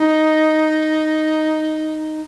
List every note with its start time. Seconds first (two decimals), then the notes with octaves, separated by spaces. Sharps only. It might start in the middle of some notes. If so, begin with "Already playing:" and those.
Already playing: D#4